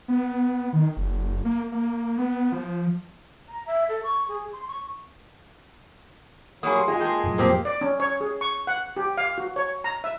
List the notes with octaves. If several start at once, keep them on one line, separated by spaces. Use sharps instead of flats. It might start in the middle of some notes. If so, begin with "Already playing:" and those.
B3
D#3
F#1
A#3
A#3
B3
F3
A#5
E5
A4
C#6
G#4
C6
C#6
F#3 A#3 G#4 B5 C#6 D#6
G4 C6
G#3 F4 G#4 G5
A#3 G#4 A5 C6 G6
F2 A2 F#3
A#2 F3 G#3 A#3 C4 G4 C5
D5
C#4
C#5
G#4
C#6
F#5
G4
F5
F#4
C#5
A#5
E5